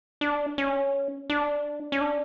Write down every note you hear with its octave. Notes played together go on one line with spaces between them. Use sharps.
D4
C#4
D4
C#4
D4